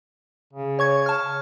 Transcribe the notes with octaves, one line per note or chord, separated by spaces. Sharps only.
C#3
C#5 C#6 G#6
A5 F6